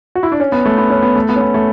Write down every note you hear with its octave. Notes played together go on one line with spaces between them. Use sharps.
F#4
E4
D4
C#4
B3
A3
B3
C#4
B3
A3
B3
C#4
B3
A3